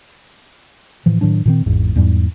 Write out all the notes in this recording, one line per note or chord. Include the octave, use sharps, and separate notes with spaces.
A2 E3 F3
A2 D#3 F#3 D4
A#2 D#3 C4
G#1 E2 G#2
E2 G#2 G3